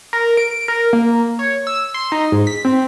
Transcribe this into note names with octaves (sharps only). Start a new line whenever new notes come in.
A#4
D7
A#4
A#3
C#5
E6
C6
D#4
G#2
B6
C4